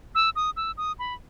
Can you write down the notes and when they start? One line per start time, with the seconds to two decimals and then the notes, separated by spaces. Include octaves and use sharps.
0.15 E6
0.36 D#6
0.57 E6
0.77 D#6
0.99 B5